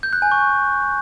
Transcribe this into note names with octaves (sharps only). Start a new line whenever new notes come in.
G6
F#6
G#5
C#6